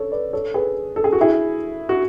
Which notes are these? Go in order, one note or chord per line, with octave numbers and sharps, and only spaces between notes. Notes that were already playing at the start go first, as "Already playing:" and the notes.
Already playing: A4 C#5
B4 D5
A4 C#5
G#4 B4
A4
G#4
F#4
E4 G#4
F#4